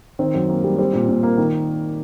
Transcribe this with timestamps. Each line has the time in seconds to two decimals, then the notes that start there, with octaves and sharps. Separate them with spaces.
0.19 D#3 C4
0.34 F#2
0.49 A#3
0.64 G3
0.78 G3 C4
0.93 A#2
1.08 A#2
1.23 A#3
1.38 D#3